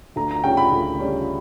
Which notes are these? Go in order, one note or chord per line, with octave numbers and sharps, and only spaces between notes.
D2 A#5
A#5
C#3 G3 C#4 G5
B5
D2
C#3 G3 C#4